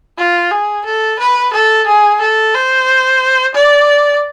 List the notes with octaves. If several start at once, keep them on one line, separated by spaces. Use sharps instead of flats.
F4
G#4
A4
B4
A4
G#4
A4
C5
D5